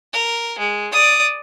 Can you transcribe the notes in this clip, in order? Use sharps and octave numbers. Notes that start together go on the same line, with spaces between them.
A#4
G#3
D5 D#6